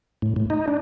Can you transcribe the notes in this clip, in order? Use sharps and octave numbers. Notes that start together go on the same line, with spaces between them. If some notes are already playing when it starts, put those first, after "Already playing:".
A2
A2
D#4
D4